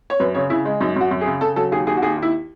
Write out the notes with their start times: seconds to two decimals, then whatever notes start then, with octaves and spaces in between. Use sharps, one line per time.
0.10 C#5
0.20 F#2 B4
0.35 C#3 C#5
0.50 C#3 E4
0.65 G#3
0.80 F#2 D#4
0.96 F#2 F#4
1.11 F#2
1.21 G#4
1.26 C#3
1.41 C#3 A4
1.56 F#3 A4
1.72 D#2 G#4
1.87 D#2 G#4
1.97 F#4
2.02 D#2 G#4
2.17 D#2 E4